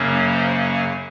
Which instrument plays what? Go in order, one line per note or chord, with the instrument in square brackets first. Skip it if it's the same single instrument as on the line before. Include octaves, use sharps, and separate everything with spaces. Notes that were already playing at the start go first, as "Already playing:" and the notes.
Already playing: [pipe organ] F#2 C#3 F#3 A#3 C#4
C5
C#5